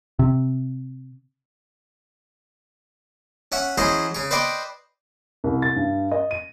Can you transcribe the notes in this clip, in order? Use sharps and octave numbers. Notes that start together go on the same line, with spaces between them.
C3
C#4 C#5 E5 F#5
E3 F#3 C#4 G#4 C5 D#5
C#3 C#5
B4 C5 D5 D#5 G5 C#6
C2
A6
G2
D#5
D#7